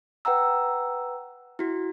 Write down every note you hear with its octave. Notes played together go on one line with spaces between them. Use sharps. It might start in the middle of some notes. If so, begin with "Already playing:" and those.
B4 F#5 G5 A#5 E6
E4 F#4